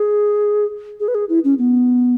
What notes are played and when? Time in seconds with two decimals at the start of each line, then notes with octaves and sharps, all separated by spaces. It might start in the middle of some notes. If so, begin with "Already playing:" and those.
Already playing: G#4
1.00 G#4
1.08 B4
1.15 G#4
1.29 E4
1.44 C#4
1.58 B3